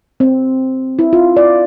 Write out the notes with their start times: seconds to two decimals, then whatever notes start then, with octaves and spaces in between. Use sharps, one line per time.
0.20 C4
0.99 E4
1.13 F4
1.37 D5